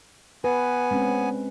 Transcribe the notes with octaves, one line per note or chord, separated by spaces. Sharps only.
B3 B4 G#5
G#3 C4 C#4